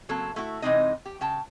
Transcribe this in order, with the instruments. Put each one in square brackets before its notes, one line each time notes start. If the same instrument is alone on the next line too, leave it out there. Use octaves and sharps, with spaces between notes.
[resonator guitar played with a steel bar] C#3 F#3 A#3 C4 A4
A3 E4 F#4
C3 E3 G#3 C4 D#4 D#5
G4
C#3 G5 A5